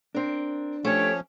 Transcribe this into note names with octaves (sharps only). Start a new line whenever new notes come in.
C4 D4 A#4
F3 A3 C#4 G4 C#5